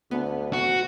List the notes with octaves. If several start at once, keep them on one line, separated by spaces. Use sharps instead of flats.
D2 B3
F#4